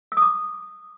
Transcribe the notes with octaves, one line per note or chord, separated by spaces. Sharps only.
E6
D#6
D6